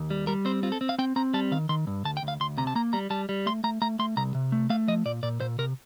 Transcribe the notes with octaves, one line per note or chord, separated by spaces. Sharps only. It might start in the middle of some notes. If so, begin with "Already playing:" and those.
Already playing: D#2
G3
G3 A#4
C4 C5
C4 F4
A4
C4
F5
C4 G5
C4 A#5
G3 A5
D#3 F5
D#3 C6
G2
D2 A5
G5
D2
F5
D2 C6
C3 A#5
A5
A#3 A#5
G3 A#5
G3 A5
G3
A3 C6
A3 A#5
A3 A#5
A3 C6
C2 A#5
C3
A3
A3 F5
F3 D#5
A#2 D5
A#2 D5
A#2 C5
C3 A#4